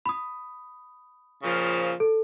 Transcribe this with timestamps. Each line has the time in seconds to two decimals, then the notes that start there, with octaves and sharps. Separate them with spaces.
0.06 B5 D#6
1.43 A#2 C#3 F3
2.00 A4